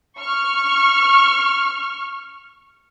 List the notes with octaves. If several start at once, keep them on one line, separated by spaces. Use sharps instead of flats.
C#6 F6